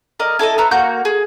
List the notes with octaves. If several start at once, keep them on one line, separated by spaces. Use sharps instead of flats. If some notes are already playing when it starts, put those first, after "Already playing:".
A#4 D5 D#5
E4 A4 C#5 D#5
B4 C#5 A#5 E6
A#3 F#4 C#6 G6
G#4